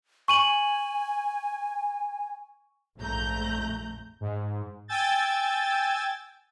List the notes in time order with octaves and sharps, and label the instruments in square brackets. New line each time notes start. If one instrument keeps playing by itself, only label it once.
[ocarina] G#5 [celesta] C#6 D#7 F#7
[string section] A#1 F2 G#2 A3 A#5 G6
[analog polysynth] G#2
G5 G#5 E6 G6 A6